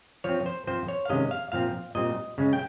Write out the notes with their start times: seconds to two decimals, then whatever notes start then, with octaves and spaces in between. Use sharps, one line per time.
0.24 F3 C4 C#5
0.46 C5
0.67 F3 C4 C5
0.88 C#5
1.05 F5
1.10 C3 D#3 G#3 C#4 D#5
1.31 F5
1.52 A#2 F3 C4 F5
1.95 A#2 G3 C4 D#5
2.38 C#3 G#3 C#4
2.53 G5